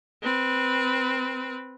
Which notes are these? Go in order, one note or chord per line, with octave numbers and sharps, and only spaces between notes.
C4 B4